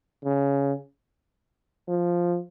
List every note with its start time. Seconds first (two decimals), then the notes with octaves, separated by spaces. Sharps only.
0.24 C#3
1.88 F3